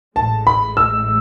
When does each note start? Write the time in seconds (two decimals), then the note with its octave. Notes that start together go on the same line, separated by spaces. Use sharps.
0.16 A1 A2 G#3 A5
0.47 B5
0.77 E6